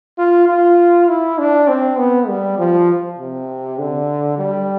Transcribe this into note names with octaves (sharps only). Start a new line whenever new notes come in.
F4
F4
E4
D4
C4
B3
G3
F3
C3
D3
G3